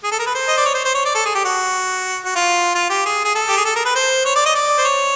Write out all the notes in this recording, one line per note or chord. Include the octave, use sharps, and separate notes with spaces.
G#4
A4
A#4
B4
C5
D#5
D5
C#5
C5
C5
C#5
D5
A4
G#4
G4
F#4
F#4
F4
F4
G4
G#4
G#4
A4
G4
G#4
A4
A#4
B4
C5
C#5
D5
D#5
D5
C5
C#5